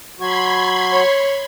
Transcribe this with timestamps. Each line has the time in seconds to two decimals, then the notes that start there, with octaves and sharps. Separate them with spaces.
0.19 F#3 F#4 B5 C6 G#6
0.93 C#5